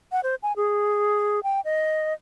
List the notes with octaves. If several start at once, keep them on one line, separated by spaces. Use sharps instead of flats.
F#5
C5
G#5
G#4
G5
D#5